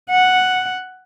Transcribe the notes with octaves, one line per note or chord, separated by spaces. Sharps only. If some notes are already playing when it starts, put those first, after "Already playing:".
F#5